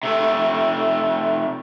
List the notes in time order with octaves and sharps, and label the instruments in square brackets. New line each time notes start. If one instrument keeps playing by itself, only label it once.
[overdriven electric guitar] C3 A3